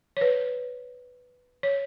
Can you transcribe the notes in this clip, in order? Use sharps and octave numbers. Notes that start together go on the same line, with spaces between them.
C#5
B4
C#5